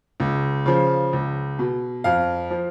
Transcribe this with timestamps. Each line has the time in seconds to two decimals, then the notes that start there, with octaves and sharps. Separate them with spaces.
0.20 C#2
0.66 C#3 F3
1.13 C#2
1.59 B2
2.04 F2 F5
2.50 F3